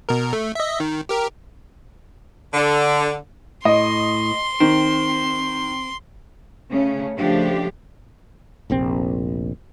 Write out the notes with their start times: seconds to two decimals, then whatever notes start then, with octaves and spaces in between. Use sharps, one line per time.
0.09 B2 A#4
0.33 A3
0.55 D#5 E5
0.80 D#3
1.09 G4 A#4
2.54 D3
3.65 A2 D#5 C6
4.60 D#3 C4
6.70 C#3 A3 C#4
7.17 C#3 F3 A3 D4 G4
8.70 F1 A#1 C4